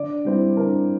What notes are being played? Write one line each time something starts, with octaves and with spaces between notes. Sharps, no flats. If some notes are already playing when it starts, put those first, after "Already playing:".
Already playing: D3 D5
G3 C4 E4
D3 A#4